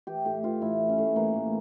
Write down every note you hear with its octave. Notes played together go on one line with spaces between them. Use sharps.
E3 G4
A2 G4
E3 F4
A2 E4
E3
C#4
A2
E3 A#3
A2